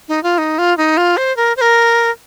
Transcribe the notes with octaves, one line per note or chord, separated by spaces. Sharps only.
D#4
F4
D#4
F4
D#4
F4
C5
A#4
C5
A#4